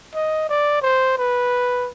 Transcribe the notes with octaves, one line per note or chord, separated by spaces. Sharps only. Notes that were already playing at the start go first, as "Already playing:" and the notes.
D#5
D5
C5
B4